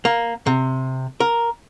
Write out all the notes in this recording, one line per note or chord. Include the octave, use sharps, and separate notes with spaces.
A#3
C3
A#4